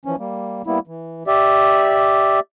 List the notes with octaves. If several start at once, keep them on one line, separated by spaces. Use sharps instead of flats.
E3 F3 C#4
G3 A#3
G3 A#3 B3 E4
E3
G4 D5 E5